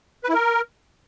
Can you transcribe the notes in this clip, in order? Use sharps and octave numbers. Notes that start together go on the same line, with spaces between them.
B4
E4
A#4